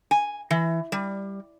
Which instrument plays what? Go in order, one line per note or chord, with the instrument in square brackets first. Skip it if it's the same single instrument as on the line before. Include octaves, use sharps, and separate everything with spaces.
[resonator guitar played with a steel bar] G#5
E3
G3